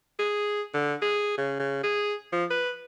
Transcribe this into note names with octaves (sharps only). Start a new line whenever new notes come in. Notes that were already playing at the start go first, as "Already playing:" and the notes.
G#4
D3
G#4
C#3
C#3
G#4
F3
B4